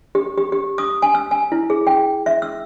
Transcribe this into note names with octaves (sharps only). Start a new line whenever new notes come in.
G4
G4
G4
D#6
G#5
E6
G#5
E4
G#4
G5
E5
E6